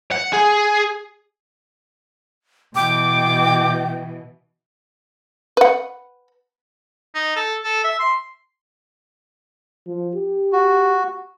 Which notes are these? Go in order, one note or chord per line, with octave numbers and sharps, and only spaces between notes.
F#5
G#4
B2 E3 G5 D6
B4 F#5
D#4
A4
A4
E5
C6
F3
G4
F#4